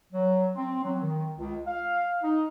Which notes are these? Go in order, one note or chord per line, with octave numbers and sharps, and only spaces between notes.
F#3
C4
F#3
D#3
C#2
F5
D#4